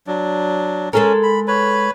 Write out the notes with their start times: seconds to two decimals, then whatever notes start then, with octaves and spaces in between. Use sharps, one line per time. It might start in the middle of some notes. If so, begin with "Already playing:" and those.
0.07 F#3 D4
0.93 G#3 C#4 A4 A#4
1.23 B5
1.48 B4 C#5 B5